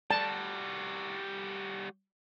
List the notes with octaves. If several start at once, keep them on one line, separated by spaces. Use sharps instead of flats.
G3 F#4 A5